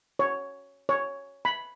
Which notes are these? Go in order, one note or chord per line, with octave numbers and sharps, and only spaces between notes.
C#5
C#5
B5